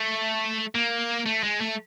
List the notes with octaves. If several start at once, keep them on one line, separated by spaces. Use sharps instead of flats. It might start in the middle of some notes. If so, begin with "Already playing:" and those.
Already playing: A3
A#3
A3
G#3
A3